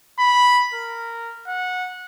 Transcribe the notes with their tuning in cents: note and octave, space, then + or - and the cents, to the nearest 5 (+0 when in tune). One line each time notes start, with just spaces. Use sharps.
B5 -5
A#4 -10
F#5 -15